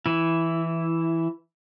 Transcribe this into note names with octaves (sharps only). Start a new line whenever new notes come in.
E3 E4